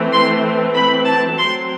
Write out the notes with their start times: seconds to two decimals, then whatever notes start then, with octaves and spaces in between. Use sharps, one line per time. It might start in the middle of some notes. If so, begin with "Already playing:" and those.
Already playing: E3 A3 C4
0.12 C6
0.74 B5
1.05 A5
1.37 F#3 C4 C6